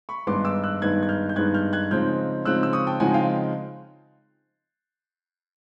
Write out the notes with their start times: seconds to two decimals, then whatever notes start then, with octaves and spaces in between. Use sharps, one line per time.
0.09 B5 C#6
0.27 G2 D#3 G#3 B3 D#4 C6 D6
0.45 D6 E6
0.64 E6 F#6
0.82 G2 D#3 G#3 B3 D#4 F#6 G#6
1.03 G#6
1.09 F6 G6
1.29 G6
1.36 G2 D#3 G#3 B3 D#4 F#6 G#6
1.54 F6 G6
1.73 F#6 G#6
1.91 C#3 F3 G#3 C4 D#4 F6 G6
2.45 C#3 F3 G#3 C4 D#4 E6 F#6
2.63 E6
2.73 C#6 D#6
2.87 G5 A5
3.00 C#3 F3 G#3 C4 D#4 F#5 G#5
3.14 F5 G5